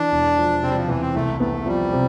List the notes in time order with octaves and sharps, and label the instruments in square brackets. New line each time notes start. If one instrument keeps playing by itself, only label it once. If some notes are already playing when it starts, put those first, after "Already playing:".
Already playing: [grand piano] E3 [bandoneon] D4
[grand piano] E1
F3
[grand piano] C3 [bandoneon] C4
[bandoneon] G3
F3
[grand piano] E2 [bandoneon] E3
[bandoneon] C4
[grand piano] C2 [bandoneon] A3
[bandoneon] A3 [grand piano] B3
[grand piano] F3 [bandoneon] G3
[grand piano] C3